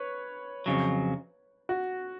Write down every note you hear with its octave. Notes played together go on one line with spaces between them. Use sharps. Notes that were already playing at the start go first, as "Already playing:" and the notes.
Already playing: B4 C#5
F2 C#3 F#3
F#4